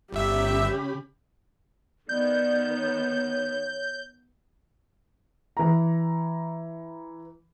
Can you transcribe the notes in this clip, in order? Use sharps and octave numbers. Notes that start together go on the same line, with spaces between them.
G1 C#3 C#4 G4 E5 B5
D#3 B3 D5 G6
C#5
E3 A#5